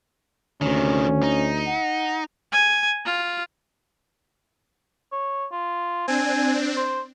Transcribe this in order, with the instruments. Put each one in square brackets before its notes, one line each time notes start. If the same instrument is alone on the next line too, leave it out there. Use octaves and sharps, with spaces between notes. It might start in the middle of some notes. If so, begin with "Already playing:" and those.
[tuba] D2 [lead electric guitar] C3 D#3 [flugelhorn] C#4
[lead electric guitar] D#4
[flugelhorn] F#5
[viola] G#5
F4
[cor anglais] C#5
F4
[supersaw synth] C4 D4 [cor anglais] G#5
[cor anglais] C5